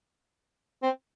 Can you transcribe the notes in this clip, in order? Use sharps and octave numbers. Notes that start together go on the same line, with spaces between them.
C4